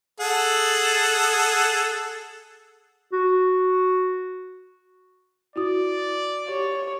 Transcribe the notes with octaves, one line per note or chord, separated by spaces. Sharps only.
G#4 A4 F#5
F#4
E4 F#4 D5 D#6
G4 C#5